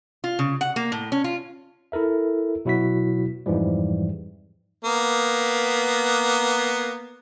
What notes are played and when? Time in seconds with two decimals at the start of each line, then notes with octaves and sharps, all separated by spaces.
0.24 F4
0.39 C#3
0.61 F#5
0.76 A#3
0.92 A2
1.12 C#4
1.24 F4
1.92 E4 A4 A#4 E5
2.65 B2 F#3 E4 F#4 B6
3.46 F2 G#2 E3 F3 G3
4.85 A#3 B3